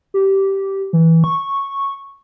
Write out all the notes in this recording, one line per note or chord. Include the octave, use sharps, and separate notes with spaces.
G4
E3
C#6